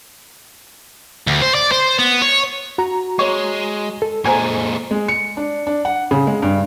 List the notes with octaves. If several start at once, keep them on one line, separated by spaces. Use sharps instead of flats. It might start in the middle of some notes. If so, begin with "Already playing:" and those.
D2
C5
D5
C5
B3
C#5
F#4 A#5
G#3 C#5
A4
A#2 G#3 A#4 C5 G#5 A#5
G#3
C#7
D4
D4
F#5
C#3
G#3
G2